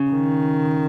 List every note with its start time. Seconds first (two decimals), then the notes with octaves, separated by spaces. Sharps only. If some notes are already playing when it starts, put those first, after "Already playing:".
Already playing: C#3
0.10 D#3